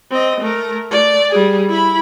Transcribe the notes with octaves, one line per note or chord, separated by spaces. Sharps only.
C4 D#5
A3 A#4
A3 D5
G3 G#4
E4 B5